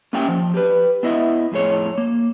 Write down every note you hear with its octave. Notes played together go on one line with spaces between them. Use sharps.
A#3 C#4 G4 E5 F#5 G5
F3
G4 B4
B3 E4 D#5 E5
F2 A2 G#4 C#5
A#3